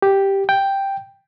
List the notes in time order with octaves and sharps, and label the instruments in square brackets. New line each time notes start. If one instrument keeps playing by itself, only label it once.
[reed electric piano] G4
G5